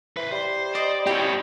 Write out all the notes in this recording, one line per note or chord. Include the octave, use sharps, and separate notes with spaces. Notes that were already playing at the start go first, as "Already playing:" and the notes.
E3 B4 C5
G3 C5
D5 D#5
C4 E4 G4 C#5 G5